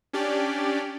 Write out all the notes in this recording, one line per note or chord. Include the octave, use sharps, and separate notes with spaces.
C#4 D4 G4 D5